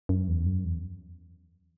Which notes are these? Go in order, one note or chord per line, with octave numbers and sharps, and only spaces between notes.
F#2
E2
F#2
E2